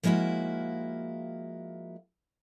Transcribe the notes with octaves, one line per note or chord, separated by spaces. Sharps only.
F3 G#3 A#3 E4 F#4